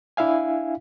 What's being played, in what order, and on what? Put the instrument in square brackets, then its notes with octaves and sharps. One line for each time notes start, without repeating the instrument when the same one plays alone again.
[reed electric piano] D4 E4 E5 F5 G#5